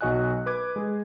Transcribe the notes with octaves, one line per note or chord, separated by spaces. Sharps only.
B1 F#4 D#5 G#5 F#6
B4 D6 G#6
G#3 G#4